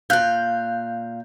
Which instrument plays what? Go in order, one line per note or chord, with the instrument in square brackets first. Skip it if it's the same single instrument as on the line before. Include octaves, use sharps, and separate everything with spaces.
[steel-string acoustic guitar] A#2 F5 [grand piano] F#6 G6